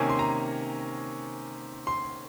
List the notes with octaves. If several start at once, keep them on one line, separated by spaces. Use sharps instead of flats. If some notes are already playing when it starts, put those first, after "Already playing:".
Already playing: C3 D#3 A#3 C#4 G#5
C6
A#5
C6